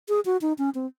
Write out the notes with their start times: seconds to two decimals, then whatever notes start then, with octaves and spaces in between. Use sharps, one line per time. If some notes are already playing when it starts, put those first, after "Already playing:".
0.09 G#4
0.26 F#4
0.41 D#4
0.58 C#4
0.75 C4